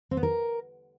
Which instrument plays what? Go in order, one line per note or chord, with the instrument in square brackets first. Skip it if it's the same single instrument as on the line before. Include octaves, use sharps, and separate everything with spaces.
[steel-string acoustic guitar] C4
B3
A#4